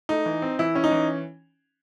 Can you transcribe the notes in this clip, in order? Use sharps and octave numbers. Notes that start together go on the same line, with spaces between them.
A3 D#4
E3
C4
E3 E4
C#4
D#4
E3